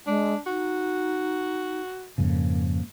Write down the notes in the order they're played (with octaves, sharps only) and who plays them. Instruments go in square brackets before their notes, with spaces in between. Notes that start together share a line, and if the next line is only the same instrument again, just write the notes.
[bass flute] G#3 [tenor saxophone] D4
[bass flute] D#4 [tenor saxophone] F#4
[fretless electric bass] F2 G#2 C#3 [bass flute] A#3